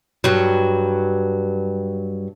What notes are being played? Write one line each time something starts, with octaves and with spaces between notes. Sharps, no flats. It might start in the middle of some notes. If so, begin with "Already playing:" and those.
G2 F#3